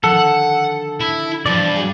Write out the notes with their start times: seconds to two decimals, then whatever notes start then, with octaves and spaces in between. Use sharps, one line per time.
0.04 D3 D#3 F3 A4 F#5
1.00 E4
1.46 G2 B2 E3 F3 D5
1.76 F#4 G#4